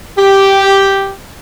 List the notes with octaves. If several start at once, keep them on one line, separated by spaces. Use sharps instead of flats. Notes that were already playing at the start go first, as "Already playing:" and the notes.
G4